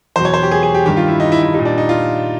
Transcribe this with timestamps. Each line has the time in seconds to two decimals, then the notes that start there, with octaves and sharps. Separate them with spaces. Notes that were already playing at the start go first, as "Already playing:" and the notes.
0.16 E2 B2 F#3 C5
0.25 C#5
0.34 C5
0.43 G4
0.51 G#4
0.63 G#4
0.74 G4
0.85 G2 D#3 G3 G4
0.97 F4
1.08 E4
1.20 D#4
1.32 E4
1.42 E4
1.54 A#2 G3 D#4
1.65 D4
1.78 D#4
1.89 F4